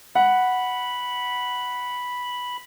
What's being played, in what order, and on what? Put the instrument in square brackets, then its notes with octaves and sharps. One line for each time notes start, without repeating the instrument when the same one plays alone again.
[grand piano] F#5 [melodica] B5